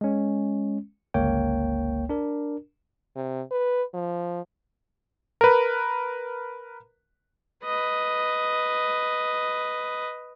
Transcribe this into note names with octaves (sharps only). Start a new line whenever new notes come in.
G#3 C#4
G1 C#2 A#3 C#5 G5
D4 A#4
C3
B4
F3
A#4 B4
B4 D#5